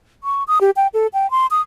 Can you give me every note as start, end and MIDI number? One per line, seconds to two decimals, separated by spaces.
0.24 0.44 85
0.48 0.59 87
0.61 0.71 67
0.76 0.87 79
0.94 1.07 69
1.13 1.29 79
1.31 1.47 84
1.51 1.61 87